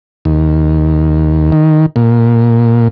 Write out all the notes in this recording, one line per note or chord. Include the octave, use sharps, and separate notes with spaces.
D#2
D#3
A#2